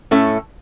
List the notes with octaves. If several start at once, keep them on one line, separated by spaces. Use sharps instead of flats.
A2 A3 C#4